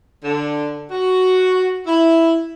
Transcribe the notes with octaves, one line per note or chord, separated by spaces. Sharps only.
D3
F#4
E4